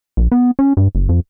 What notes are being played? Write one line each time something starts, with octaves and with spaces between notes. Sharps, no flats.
A#1
B3
C#4
G2
F#1
F2